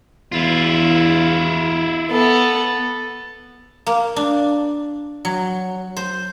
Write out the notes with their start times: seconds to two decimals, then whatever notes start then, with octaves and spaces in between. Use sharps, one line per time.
0.32 E2 E4 F4
2.11 B3 A4
3.87 A#3
4.16 D4
5.25 F#3
5.97 C5